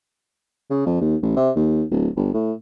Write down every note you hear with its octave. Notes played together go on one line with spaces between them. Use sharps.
C#3
F2
D#2
A1
C3
D#2
D1
G1
A2